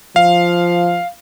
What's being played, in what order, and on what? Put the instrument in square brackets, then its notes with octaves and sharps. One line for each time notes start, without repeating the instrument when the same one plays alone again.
[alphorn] F3 [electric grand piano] F5